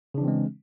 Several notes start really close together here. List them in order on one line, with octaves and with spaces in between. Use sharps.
C#3 D4 E3 C4 G#3